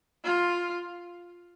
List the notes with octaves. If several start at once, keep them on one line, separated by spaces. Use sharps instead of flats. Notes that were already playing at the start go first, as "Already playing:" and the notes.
F4